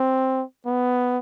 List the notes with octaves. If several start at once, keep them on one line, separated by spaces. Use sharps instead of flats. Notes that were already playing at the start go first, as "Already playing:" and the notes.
Already playing: C4
B3